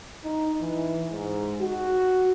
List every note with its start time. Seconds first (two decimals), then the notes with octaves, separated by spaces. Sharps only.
0.24 D#4
0.61 E3
1.12 G#2
1.61 F#4